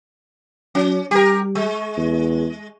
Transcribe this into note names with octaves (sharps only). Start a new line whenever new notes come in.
F#3 C#4
G3 G4 A#4
G#3
E2